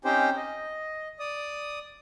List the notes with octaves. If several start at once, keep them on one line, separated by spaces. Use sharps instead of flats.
C4 C#4 D#4 G4 C5 G5
D#5
D5 D#6